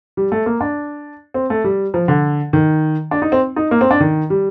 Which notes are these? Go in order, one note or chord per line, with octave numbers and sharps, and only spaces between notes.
G3
A3
A#3
D4
C4
A3
G3
F3
D3
D#3
D4
D#4
C4
D#4
A#3
C4
D4
D#3
G3